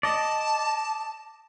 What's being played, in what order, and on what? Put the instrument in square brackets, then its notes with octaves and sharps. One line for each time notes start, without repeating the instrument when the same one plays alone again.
[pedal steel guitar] D5 D#5 [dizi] A5